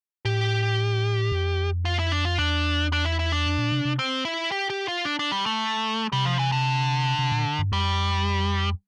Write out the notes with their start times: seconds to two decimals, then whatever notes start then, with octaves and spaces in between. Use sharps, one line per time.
0.25 A2 G4
1.32 F2
1.85 F4
1.99 E4
2.12 D4
2.25 F4
2.38 E2 D4
2.93 D4
3.05 E4
3.19 E4
3.32 D4
3.46 F2
3.58 A#2
3.71 C3
3.85 C3
3.99 C4
4.25 E4
4.52 G4
4.70 G4
4.88 F4
5.05 D4
5.19 D4
5.32 G3
5.46 A3
6.12 C3 G3
6.25 F3
6.39 E3
6.52 D3
7.19 C3
7.32 A#2
7.59 G2
7.72 F2 G3